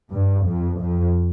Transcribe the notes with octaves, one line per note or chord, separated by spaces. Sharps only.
G2
F2
F2